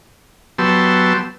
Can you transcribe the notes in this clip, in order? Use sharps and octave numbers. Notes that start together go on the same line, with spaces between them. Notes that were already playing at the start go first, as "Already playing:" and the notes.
F#3 B3 G4 A5 C6 E6